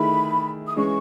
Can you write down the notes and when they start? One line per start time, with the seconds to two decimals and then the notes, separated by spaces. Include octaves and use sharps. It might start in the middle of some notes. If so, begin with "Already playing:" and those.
Already playing: D#3 A3 E4 G#4 B5
0.68 D#6
0.76 E3 G#3 C#4 C#6